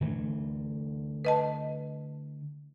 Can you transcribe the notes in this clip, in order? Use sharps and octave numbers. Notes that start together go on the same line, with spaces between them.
D3 E3 A3
B4 D#5 A5